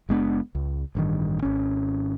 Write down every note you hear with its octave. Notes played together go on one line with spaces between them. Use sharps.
F#1 G#3 B3 D4
C#2
A1 G2 D#3
G#1 C#4